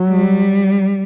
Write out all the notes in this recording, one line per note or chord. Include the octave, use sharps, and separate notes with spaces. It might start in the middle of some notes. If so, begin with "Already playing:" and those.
Already playing: F#3
G3